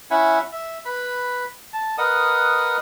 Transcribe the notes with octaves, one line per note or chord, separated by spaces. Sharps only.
C#4 E4 E5 F#5 G#5 B5
E5
B4 B5
A5
A#4 B4 D#5 F#5 D#6